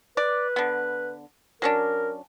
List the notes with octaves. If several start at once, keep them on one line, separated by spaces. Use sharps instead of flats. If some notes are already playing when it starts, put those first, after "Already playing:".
B4 D5
D3 B3
F#3 C#4 D4 A#4